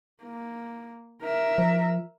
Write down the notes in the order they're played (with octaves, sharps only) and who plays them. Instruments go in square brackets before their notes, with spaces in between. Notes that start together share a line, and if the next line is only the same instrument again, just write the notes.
[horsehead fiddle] A#3
A#4 E5
[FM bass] F3